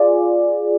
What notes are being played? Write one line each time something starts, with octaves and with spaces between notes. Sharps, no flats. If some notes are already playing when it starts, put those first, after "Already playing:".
Already playing: F4 G#4 D5